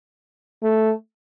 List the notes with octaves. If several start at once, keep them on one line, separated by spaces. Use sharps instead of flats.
A3